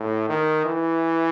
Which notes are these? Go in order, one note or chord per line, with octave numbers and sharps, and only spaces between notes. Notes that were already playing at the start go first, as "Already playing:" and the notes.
Already playing: A2
D#3
E3